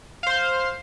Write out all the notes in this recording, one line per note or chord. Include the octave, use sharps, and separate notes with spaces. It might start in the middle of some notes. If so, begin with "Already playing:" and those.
C5 F5 C6